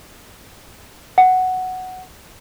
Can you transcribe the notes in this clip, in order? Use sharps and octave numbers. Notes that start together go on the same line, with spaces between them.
F#5